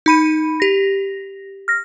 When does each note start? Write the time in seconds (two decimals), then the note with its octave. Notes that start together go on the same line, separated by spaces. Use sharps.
0.06 D#4 B5 D#7
0.60 G4 A#6
1.68 F6 A#6